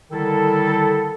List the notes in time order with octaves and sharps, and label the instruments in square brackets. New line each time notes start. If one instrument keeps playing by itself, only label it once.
[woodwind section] D3 D#3 G3 E4 A4